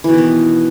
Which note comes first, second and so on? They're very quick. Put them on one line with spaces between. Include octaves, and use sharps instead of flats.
E3 B2 D#3 B3